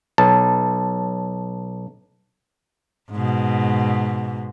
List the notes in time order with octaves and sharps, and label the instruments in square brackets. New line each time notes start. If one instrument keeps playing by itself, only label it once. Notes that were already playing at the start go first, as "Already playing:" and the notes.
[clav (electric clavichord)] B1 [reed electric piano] A5
[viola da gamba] G#2 B2